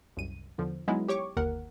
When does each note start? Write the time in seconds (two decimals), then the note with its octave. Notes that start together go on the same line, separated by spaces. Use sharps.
0.17 C2 F#2 D#7
0.58 E2 D3 F3
0.88 F#3 G#3 B3 C#4 D#4 E4
1.08 G4 C#5 C#6 D6
1.37 G1 D#2 A#4 F#5